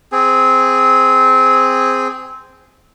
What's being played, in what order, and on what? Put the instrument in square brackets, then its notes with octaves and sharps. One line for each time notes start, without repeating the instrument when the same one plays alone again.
[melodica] C4 G#4